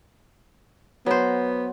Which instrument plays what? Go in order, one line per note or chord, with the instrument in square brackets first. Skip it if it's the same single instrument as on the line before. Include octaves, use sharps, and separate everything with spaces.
[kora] F#3 C5 [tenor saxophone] B3